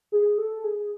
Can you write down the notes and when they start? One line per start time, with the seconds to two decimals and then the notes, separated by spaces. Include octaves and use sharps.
0.12 G#4
0.38 A4
0.64 G#4